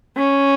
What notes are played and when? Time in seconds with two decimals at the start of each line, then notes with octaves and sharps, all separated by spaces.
0.17 C#4